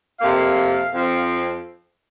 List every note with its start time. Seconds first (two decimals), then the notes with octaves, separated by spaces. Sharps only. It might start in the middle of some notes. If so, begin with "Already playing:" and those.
0.20 F2 C3 A#3 F5
0.93 F2 F3 C4